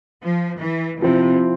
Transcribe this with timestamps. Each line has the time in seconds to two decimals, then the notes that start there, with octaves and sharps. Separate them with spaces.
0.23 F3
0.62 E3
1.02 C3 F3 C4 E4